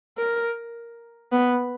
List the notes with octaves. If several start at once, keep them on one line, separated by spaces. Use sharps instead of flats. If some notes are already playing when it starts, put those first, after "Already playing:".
A#4
B3